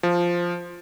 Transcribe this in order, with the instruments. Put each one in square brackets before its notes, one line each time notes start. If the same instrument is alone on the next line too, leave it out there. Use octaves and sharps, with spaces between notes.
[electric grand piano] F3